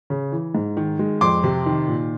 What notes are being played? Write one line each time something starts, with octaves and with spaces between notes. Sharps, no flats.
C#3
E3
G#2
D#3
G#3
F2 C6 D6
C3
D#3
A#2